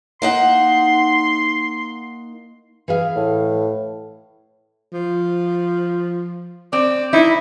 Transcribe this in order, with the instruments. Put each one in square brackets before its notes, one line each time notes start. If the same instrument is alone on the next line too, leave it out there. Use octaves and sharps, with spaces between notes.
[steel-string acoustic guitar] A#3 D#4 F#5 [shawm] C6
[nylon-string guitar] E3 G#4 F5
[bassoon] A2
[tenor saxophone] F3
[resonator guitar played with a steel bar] C4 [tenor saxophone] D5
[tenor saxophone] D#4 [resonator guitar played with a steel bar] E4